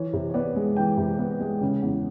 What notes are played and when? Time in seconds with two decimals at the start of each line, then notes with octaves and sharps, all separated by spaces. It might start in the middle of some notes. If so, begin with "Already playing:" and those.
Already playing: E3 C#5
0.13 C3
0.30 C#5
0.34 B3 D5
0.56 G#3
0.77 E3 G5
0.97 C3
1.19 B3
1.41 G#3
1.61 C#3
1.82 E2